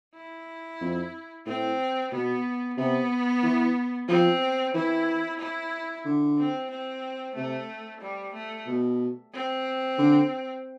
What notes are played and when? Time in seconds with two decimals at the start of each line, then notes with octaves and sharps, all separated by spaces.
0.15 E4
0.81 F2
1.46 A2 C4
2.12 B2 B3
2.77 C3 B3
3.43 E3
4.08 F3 C4
4.74 E3 E4
5.39 E4
6.05 D3
6.38 C4
6.71 C4
7.35 C3 A3
8.01 G3
8.34 A3
8.67 B2
9.33 C4
9.98 D3